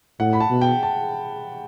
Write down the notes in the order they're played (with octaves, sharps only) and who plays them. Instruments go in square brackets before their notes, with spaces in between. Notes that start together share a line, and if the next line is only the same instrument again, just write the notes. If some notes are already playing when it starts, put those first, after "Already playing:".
[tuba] A2 [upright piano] F#5
[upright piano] B5
A5
[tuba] B2
[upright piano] G5
A5